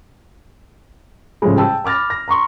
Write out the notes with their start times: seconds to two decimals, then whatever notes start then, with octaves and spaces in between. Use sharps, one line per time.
1.42 A2 C#3 F3 G3 G#3
1.57 G5 A5 E6
1.84 B5 D6 F6 A6 A#6
2.10 A#6
2.28 A#5 C6 C#6